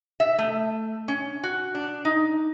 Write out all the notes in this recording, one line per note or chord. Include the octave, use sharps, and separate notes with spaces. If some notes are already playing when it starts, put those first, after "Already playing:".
E5
A3
C#4
F#4
D4
D#4